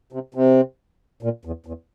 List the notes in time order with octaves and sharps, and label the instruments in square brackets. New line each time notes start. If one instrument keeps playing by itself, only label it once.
[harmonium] C3
C3
A#2
E2
E2